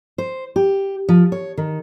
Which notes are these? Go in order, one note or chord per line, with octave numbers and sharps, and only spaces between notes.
C5
G4
F3
C#5
D#3